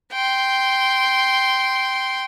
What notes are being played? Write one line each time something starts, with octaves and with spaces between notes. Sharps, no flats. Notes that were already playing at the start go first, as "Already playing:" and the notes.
G5 C6